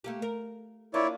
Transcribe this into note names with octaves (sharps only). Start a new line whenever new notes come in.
A3 A#3 G4
A#4
A#3 D4 E4 F4 C#5 D5